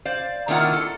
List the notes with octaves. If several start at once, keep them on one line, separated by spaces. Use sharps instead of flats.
C5 D5 F5
D#3 A#3 D4 E4 F4 F#5
A4